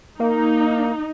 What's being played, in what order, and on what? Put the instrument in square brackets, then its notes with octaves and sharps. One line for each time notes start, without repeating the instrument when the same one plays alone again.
[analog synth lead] A#3 [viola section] D#4